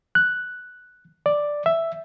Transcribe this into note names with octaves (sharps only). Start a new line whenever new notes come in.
F#6
D5
E5